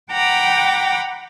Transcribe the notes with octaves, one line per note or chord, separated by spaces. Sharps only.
F#5 G5 A#5 B5 D6